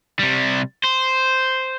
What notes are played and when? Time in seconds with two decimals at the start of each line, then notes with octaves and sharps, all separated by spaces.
0.19 C3 G3
0.84 C5